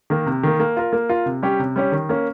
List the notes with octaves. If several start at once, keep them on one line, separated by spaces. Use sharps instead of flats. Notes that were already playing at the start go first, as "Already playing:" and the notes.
D#3 A#3
C3
D#3 A#3
A#3
F4 A#4
A#3
F4 A#4
C3
G3 C#4 G4 C#5
C3
G3 C#4 G4 C#5
D#3
A#3 C#4